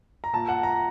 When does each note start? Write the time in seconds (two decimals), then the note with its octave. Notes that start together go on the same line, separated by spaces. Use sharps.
0.24 A#5
0.33 A#2 A5
0.48 F#5
0.63 A#5